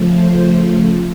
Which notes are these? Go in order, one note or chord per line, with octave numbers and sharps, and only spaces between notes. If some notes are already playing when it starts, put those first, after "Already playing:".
Already playing: C#3 F3 A3
C5